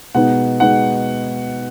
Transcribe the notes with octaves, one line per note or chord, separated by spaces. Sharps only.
B2 G#3 B3 D#4 F#5
B2 G#3 B3 D#4 F#5